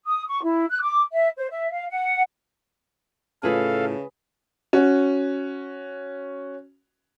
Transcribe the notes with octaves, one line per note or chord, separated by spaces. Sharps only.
D#6
C#6
E4
F#6
D6
E5
C5
E5
F5
F#5
A2 C#3 E4 F4 G#4 A4 B4 F5
C#4 F#4